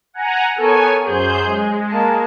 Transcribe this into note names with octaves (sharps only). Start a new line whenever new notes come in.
F#5 G#5 A#5
B3 A4 A#4 C#5 G#5
F#2 G#4 C5 G6
G#3
A#3 A5